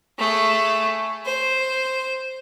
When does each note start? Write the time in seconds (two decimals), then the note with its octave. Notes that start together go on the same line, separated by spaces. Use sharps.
0.18 A3 G#4
1.25 C5